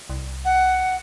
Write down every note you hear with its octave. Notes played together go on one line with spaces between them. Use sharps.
C2
F#5